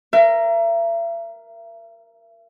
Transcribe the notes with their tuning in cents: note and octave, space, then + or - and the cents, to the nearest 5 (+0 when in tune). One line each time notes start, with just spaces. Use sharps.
A#4 +0 E5 +40